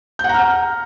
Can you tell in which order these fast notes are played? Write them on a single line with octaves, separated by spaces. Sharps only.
G6 F#5 A#5 F6